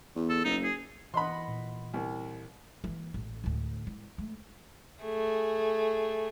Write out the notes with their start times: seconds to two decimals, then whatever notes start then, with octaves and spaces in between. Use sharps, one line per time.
0.16 E2
0.30 A4
0.45 F#1 D#4
0.64 G#4
1.14 E3 D#5 F#5 B5 C6
1.48 A#2
1.94 C2
2.84 E3 A#3
3.14 A1
3.44 D2 A2
3.87 E4
4.18 A3
5.03 A3 G#4